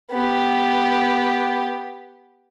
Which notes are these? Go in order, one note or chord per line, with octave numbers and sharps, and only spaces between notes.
B3 G4